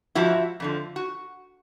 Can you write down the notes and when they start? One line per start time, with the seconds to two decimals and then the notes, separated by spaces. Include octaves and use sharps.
0.15 G#2 F3 E4 F#4
0.60 F2 D3 F3
0.96 F#4